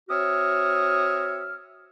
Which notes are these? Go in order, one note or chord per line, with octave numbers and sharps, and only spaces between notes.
C4 F#4 C#5 E5 D#6 F6